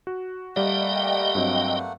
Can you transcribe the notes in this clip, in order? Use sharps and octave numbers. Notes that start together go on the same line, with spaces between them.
F#4
G3 A3 A#3 D5 D#5 F#5 G5
G2 F#3 C4